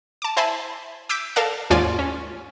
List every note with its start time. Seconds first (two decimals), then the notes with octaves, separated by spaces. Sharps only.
0.22 A5 D6
0.37 E4 C5 E5 G#5 A5 B5
1.09 D6 E6 G6 B6 D7
1.36 A4 A#4 D5 F5 A5 F6
1.70 D#2 G#2 C#4 F4 D5 G#5
1.99 C#4